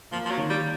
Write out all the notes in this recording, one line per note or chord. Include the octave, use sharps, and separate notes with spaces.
F3 A#3
F3
F#3
D#3
G3